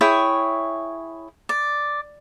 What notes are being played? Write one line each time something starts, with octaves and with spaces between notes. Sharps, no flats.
E4 G#4 C#5 G5
D5